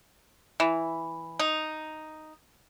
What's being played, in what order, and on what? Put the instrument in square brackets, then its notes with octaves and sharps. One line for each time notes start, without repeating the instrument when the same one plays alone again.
[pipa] E3
D#4